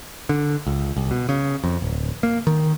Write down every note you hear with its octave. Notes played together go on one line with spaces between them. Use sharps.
D3
C#2
C2
B2
C#3
F2
D1
A#3
D#3